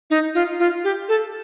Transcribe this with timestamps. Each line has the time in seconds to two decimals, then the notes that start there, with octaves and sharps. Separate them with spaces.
0.10 D#4
0.35 F4
0.59 F4
0.84 G4
1.09 A4